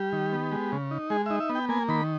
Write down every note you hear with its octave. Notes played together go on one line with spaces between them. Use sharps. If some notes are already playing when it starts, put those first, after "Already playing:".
Already playing: G3 G4
D#3
B3
G#3
C#3
D#4
G#3 G#4
D#4 E5
E5
B3
G5
A#3 G#5
D#3 B5